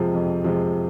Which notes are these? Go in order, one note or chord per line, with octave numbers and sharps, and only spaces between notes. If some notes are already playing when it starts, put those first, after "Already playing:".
Already playing: F2 C3 F3 G#3
F2
C3 F3 G#3